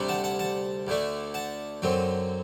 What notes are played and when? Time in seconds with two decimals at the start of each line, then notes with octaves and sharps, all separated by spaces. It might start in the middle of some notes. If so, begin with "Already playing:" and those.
Already playing: D2 C3 G3 D4
0.09 F#5 A5
0.24 F#5 A5
0.39 F#5 A5
0.87 D2 D3 A3 D4
1.34 F#5 A5
1.82 F#2 D3 F#3 C4